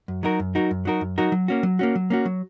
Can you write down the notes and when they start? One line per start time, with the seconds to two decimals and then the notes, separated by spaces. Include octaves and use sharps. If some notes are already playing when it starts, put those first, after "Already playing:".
0.08 F#2
0.23 F#3 D#4 F#4 A#4
0.40 F#2
0.55 F#3 D#4 F#4 A#4
0.71 F#2
0.85 F#3 D#4 F#4 A#4
1.01 F#2
1.18 F#3 D#4 F#4 A#4
1.32 F#3
1.48 A#3 C#4 F#4
1.63 F#3
1.79 A#3 C#4 F#4
1.96 F#3
2.10 A#3 C#4 F#4
2.25 F#3